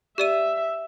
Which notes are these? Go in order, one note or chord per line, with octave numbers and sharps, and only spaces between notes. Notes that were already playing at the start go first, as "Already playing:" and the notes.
G4 D5 E5 D#7